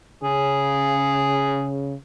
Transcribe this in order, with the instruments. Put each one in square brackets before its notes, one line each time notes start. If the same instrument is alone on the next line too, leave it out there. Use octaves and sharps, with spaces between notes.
[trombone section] C#3 [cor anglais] G#4